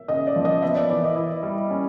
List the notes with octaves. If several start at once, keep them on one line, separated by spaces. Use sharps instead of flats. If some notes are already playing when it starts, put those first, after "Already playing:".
Already playing: E5
C#3 D#5
D5
F3
D#5
B3 E5
D5
E3 D5
D#5
E4
G3
C#4